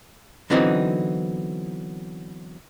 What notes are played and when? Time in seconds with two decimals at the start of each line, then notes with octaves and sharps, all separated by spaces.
0.50 D3 E3 F#3 B3 C4 D#4